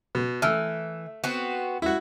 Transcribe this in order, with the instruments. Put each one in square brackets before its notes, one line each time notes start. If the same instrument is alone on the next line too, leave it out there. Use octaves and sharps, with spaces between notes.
[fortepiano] B2
[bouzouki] E3 [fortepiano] A3 E6 F6
[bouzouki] B3 C4 F#4
[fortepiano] E4 F#4